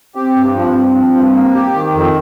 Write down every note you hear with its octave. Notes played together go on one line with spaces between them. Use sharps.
C4 G4
G2
F3 C4
G2
F3
G2
A#3
G4
D#3
F2